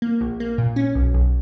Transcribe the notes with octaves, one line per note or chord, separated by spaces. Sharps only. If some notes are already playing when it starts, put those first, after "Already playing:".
A#3
A#1
A#3
A#2
C#4
B1
B1